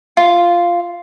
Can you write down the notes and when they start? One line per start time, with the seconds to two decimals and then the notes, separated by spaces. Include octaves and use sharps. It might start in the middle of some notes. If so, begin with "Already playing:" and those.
0.17 F4